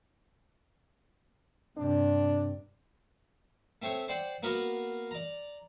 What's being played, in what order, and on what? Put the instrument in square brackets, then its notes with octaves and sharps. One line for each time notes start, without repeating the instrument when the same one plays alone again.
[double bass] G2 C3 [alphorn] D4
[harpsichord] A3 C4 C#5
C5 D5 F#5 G5
A#3 B3 F#4 A#4
D5 A#5